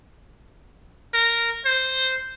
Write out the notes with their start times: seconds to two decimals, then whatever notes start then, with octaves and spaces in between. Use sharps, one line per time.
1.14 A#4
1.66 C5